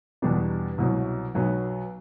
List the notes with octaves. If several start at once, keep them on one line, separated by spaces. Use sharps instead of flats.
E2 B2 G3 B3 D4
C2 B2 F#3
B1 B2 F#3 B3